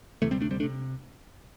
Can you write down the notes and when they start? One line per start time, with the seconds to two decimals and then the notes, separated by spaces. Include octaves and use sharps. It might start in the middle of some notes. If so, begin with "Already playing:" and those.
0.22 D2 C3 E3 A3
0.31 G3 C4
0.41 A3 D4
0.51 G3 C4
0.60 A3 D4
0.63 C3